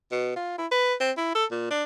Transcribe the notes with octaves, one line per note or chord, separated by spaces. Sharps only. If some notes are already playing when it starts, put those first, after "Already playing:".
B2
F4
E4
B4
C4
E4
A4
A#2
D4